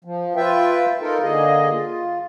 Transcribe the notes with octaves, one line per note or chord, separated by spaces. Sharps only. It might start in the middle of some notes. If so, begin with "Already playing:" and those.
F3
F4 B4 E5 G5
D#4 F4 A4 A#4
D3 A#3 G#4 D#5
F4